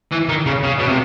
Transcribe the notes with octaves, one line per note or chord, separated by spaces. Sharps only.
E3
D#3
C#3
C#3
B2
C3